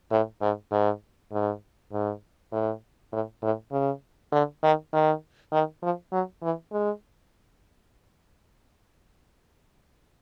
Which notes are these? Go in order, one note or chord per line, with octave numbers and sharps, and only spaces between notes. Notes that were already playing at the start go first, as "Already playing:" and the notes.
A2
G#2
G#2
G#2
G#2
A2
A2
A2
C#3
D3
D#3
D#3
D#3
F3
F#3
E3
G#3